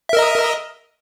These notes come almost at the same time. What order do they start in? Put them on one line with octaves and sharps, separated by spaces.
E5 A#4 D#5